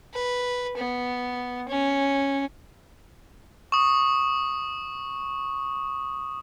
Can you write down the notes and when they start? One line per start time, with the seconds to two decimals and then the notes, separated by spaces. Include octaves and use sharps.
0.14 B4
0.77 B3
1.68 C#4
3.72 C#6 D#6